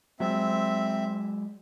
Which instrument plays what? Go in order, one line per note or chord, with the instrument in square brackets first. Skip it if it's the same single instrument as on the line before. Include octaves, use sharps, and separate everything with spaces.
[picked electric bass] F#3 G#3 [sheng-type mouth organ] C4 E5